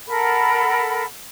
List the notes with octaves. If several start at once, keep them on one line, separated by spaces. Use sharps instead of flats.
A4 A#4 F#5 B5